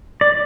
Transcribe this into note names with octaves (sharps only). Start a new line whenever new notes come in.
D5